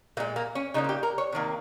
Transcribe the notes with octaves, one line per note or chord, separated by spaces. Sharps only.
A#2 G#3 A#3
A#3
C#4
C#3 G3 A#3 D#4
F4
G4
A#4
C#5
C3 D#3 A#3